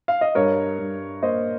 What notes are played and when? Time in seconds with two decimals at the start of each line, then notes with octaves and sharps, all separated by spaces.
0.08 F5
0.21 D#5
0.35 G2 A#4 C#5
0.79 G2
1.22 A#3 C5 D#5